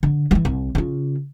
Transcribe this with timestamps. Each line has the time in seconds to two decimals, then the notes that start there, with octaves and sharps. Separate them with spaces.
0.03 D3
0.31 E3 G3
0.45 C2
0.75 C#3 F4